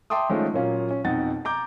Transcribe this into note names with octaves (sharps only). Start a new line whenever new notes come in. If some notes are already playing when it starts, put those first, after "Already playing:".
E5 G5 A5 C6 D6 D#6
D#3 F3 G#3 A3 C#4
A#2 F#3 A#3 C#4 F4
C#4
F2 B2 D#4 F#5 A6
A#5 D6 G6